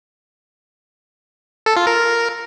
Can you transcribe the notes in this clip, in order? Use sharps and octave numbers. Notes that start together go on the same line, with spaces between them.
A4
F4
A#4